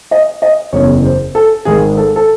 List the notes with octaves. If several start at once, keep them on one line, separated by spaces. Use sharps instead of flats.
D#5
D#5
F#1 E2 C#3 C#5
C5
A4
G#1 G#2 D#3 G#3 G#4
A4
A4